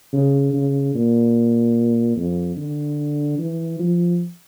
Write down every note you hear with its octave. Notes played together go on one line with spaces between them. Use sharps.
C#3
C#3
A#2
F2
D3
E3
F3